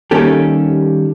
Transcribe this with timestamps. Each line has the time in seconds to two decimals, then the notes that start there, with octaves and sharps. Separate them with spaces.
0.11 D#3 G3 A#3 C#4 G4 A4